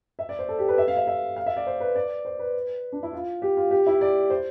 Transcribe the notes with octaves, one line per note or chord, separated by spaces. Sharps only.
E5
D5
C5
A4
G4
B4
E5
F5
E5
E5
F5
E5
D5
C5
B4
D5
C5
B4
D4
E4
F4
G4
F4
G4
E4
D5
C5